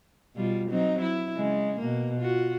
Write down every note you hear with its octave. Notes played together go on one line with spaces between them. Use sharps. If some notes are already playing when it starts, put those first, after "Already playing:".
B2 G3 F4
F#3 C4 D#4
E4
C#3 G#3
B2 A#3
F4 F#4